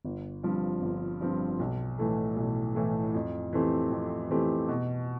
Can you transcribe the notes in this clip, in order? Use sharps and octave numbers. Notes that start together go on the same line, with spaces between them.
G1
G2 F3 C4
G1
G2 F3 C4
B1
A2 E3 A3
B1
A2 E3 A3
F2
E3 A3 C4 G4
F2
E3 A3 C4 G4
B2